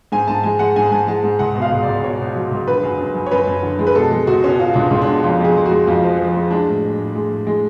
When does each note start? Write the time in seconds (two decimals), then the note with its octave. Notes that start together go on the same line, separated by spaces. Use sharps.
0.12 G#2 G#5
0.28 G#2 A5
0.43 G#3 G#5
0.59 G#3 F#5
0.76 G#2 G#5
0.86 A5
0.91 G#2 G#5
1.07 G#3 A5
1.24 G#2
1.39 C#2 F#5
1.56 B2
1.62 F5
1.72 C#2
1.83 D5
1.88 C#2
2.04 B2 C#5
2.20 B2
2.35 F#3
2.51 C#2
2.68 D3 B4
2.83 F#2
3.00 F#2
3.15 F#2
3.26 C#5
3.31 F#2 B4
3.47 F#2
3.63 D3
3.79 G#3
3.87 B4
3.95 B2 A4
4.12 G#3
4.27 C#2 F#4
4.44 B2 C#4
4.60 B2 F4
4.74 C#2 D4
4.87 C#2 C#4
5.02 D4
5.08 B2
5.23 F2 F4
5.40 F2 G#4
5.56 F2
5.65 F#4
5.71 G#3
5.87 F2 F4
6.04 F3
6.20 F3
6.35 G#3
6.51 G#3 D4
6.67 A2
6.83 A2
6.99 A2
7.15 G#3
7.32 A2
7.47 G#3